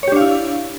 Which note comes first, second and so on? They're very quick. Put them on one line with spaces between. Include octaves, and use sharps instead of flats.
C#5 G4 D4 F5 E4